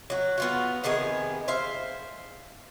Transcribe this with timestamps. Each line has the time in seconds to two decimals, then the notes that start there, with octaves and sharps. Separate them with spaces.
0.10 F#3 F#4
0.38 B3 F4 F#4
0.84 C3 D#3 B3 G#4
1.48 C5 E5 F5